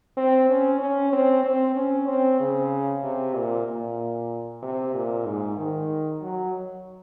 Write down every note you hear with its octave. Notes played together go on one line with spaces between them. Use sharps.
C4
C#4
C#4
C4
C4
C#4
C4
C#3
C3
A#2
A#2
C3
A#2
G#2
D#3
F#3